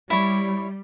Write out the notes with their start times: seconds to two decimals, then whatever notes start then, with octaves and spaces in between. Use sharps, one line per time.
0.10 G3 E4 C#5